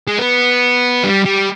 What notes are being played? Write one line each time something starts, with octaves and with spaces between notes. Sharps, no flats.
G#3
B3
G3
G3